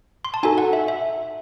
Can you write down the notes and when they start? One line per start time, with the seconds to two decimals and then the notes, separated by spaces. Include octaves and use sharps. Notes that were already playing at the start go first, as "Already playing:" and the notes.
0.25 C6
0.34 A5
0.43 D#4 F#4 A4 G#5
0.58 F#5
0.73 E5
0.88 E5